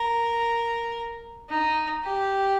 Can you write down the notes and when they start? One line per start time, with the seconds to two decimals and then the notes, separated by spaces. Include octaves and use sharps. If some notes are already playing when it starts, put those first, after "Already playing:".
Already playing: A#4
1.49 D#4
2.04 G4